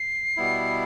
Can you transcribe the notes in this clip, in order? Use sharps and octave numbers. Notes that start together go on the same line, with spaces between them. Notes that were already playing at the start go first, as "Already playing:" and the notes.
Already playing: C7
B2 G3 B3 E4